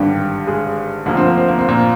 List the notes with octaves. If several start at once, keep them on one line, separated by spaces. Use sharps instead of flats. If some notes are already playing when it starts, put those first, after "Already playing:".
Already playing: G#1 G2 D3 G3 G4
G#3 G#4
D2 D3 F3 A#3
C4
A#3
C4
A#3
C4
A#2 A#3